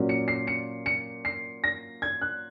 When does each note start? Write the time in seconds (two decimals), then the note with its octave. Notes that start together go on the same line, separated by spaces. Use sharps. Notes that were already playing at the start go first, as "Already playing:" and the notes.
Already playing: A#2 F#3 C#4
0.09 C#7
0.28 C7
0.47 C#7
0.86 C#7
1.25 C7
1.64 A#6
2.02 G#6
2.21 F#6